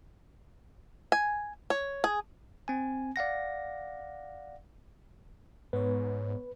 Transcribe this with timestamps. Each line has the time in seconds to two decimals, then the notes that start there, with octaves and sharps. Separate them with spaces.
1.12 G#5
1.70 C#5
2.04 G#4
2.68 C4 G#5
3.16 D5 F5 F#5 A#6
5.73 G#2 B3 B4 C#5